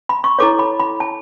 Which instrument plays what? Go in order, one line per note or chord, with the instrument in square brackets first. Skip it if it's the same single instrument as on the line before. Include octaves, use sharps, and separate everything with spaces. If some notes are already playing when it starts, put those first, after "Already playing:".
[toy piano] B5
C#6
E4 A4 C#5 D6
B5
B5
A5